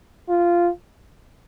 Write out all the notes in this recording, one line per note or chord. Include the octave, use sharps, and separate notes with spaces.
F4